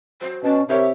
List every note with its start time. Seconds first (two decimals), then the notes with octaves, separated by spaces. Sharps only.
0.21 F#3 C5
0.43 B2 C#4 A5
0.69 C3 E4 G4 A#4 C#5 E5